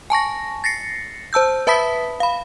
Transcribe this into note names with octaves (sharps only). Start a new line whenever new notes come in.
G#5 A5 C#6 A#6
A6 A#6 C7 C#7
C5 A5 E6 G6
B4 E5 A5 B5 D#6 B6
F5 B5